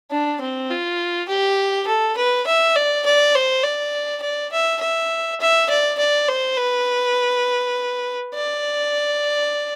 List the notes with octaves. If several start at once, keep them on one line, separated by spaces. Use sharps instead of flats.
D4
C4
F4
G4
A4
B4
E5
D5
D5
C5
D5
D5
E5
E5
E5
D5
D5
C5
B4
D5